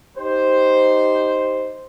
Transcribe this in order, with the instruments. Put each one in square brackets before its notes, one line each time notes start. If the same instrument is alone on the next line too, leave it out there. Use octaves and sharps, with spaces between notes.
[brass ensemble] D#4 G4 C5